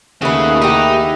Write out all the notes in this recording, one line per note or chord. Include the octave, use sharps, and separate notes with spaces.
D#2 C#3 A3 F#4 G#4 B4 F#5
D#4 E4 G4